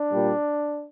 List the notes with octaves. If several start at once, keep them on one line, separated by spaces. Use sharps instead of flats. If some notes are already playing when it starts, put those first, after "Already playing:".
Already playing: D4
A#2 G3